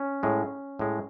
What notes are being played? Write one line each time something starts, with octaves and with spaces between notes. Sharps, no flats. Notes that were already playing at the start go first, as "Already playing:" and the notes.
Already playing: C#4
A2 G#3
A2 G#3